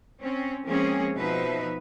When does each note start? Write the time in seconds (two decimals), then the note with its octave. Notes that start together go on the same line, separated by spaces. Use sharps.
0.21 C4 C#4
0.64 F3 G#3 A#3 C4 C#4 G#4
1.15 B2 F3 D#4 B4 E5